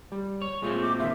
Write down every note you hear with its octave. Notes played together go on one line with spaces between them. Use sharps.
G3
C#5
A#2 G#3 A3 C4 F4
D6
D#3 F4 E5